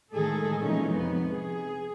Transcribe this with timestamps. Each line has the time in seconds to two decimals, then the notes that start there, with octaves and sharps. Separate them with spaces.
0.14 A2 D#3 G#3 G#4 A4
0.61 A#2 E3 F3 G#3 C#4 D#4
0.93 F2 C3 B3
1.28 G#4